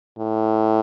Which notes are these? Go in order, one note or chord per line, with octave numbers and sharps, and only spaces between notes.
A2